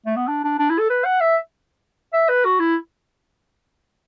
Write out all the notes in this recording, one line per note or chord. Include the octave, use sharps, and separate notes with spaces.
A3
B3
D4
D4
D4
E4
A4
B4
F#5
E5
E5
B4
F#4
E4